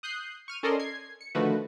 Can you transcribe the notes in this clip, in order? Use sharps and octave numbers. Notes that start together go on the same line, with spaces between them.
D#6 F#6 G6 C7
C#6 F6 D#7
C#4 A4 A#4 D5 D#5 C6
G#6 C7
C#7
D3 D#3 F3 A3 F#4 B4